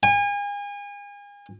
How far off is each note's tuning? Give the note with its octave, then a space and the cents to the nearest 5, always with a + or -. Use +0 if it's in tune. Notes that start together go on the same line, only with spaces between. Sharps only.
G#5 -35